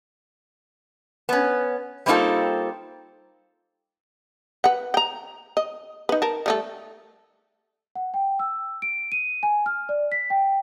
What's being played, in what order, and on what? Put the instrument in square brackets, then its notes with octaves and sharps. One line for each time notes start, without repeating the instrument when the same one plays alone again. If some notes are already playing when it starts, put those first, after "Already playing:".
[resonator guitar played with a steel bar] B3 C#4
G3 A#3 C4 D#4 F4 A4
[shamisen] B4 F#5
G5 A#5
D#5
D#4 B4
A#4 A5
G3 A3 A4
[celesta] F#5
G5
E6
D7
D#7
G#5
F6
D5
B6
G5